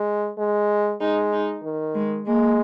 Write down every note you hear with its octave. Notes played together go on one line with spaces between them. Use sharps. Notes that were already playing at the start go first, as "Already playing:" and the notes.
Already playing: G#3
G#3
G#3 D#4
D#4
D#3
G#3
G#3 A#3